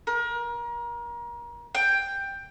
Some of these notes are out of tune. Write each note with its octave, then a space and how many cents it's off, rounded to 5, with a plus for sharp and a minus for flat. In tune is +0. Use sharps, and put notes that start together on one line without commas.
A#4 +30
G5 +10